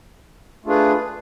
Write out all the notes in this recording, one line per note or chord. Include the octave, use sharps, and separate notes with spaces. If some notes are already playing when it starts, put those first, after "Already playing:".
A3 D4 F4 G#4 B4